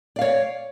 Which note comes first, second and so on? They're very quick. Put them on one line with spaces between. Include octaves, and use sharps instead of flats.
D5 F5 C#5